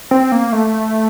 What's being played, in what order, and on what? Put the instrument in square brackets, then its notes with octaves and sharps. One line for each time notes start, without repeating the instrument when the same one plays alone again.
[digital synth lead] C4
A#3
A3